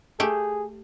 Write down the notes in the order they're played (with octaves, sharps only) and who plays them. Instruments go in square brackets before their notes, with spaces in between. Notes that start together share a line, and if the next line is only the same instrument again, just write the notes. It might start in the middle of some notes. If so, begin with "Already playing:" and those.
[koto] A3 G4 [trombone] G#4